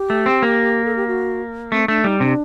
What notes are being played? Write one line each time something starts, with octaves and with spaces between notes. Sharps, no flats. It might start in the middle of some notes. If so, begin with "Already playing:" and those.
Already playing: G4
A3
C4
A#3
A4
G4
F#4
A3 C4
A3 D4
G3 D#4
C3 D4